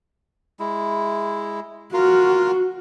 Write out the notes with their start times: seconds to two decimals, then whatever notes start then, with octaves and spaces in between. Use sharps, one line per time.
0.59 G#3 E4
1.93 F4 F#4 A#4 F5